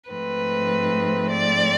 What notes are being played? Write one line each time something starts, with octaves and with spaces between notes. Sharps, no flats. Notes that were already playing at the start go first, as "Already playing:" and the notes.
G#2 F3 A3 C4 B4
D5